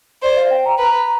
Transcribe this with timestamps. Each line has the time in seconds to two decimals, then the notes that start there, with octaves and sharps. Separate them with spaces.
0.23 C5 D5
0.36 F5
0.50 G5
0.65 A#5
0.78 B4 A#5